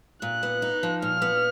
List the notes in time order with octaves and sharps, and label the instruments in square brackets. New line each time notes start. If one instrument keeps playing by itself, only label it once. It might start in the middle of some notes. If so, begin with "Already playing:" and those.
[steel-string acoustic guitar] A#2 [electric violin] F#6
[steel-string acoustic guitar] B3
D#4
F3
[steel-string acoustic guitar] A#2 [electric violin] F6
[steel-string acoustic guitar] B3